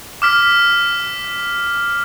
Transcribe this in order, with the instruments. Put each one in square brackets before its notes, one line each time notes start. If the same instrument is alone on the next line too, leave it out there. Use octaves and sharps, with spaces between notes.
[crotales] D6 F6 B6